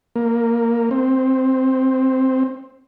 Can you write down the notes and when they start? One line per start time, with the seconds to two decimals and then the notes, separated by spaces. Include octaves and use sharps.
0.16 A#3
0.91 C4